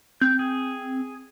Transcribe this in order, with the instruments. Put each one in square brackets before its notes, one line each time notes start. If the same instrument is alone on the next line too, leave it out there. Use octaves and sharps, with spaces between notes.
[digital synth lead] C4 [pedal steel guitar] G6
[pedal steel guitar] G#4